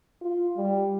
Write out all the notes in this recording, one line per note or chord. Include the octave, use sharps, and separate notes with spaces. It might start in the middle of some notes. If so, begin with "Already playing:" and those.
F4
G3